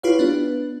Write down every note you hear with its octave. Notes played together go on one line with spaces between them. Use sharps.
E4 F4 G4 B4 C#5 F5
B3 D4 B4